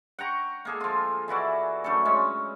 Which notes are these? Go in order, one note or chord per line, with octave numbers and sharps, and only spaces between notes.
F#5 G5 A#5 C#6
A#3 G#4 A4
F3 F4
E3 E4 F#4 D5
F#2 A3 D4 A4
G#3 C#4 C#6